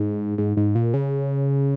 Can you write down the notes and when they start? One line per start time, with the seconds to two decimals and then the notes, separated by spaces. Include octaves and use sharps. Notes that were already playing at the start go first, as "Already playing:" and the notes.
Already playing: G#2
0.38 G#2
0.57 G#2
0.75 A#2
0.94 C#3